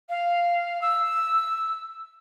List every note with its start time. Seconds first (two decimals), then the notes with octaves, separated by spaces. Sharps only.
0.09 F5
0.81 E6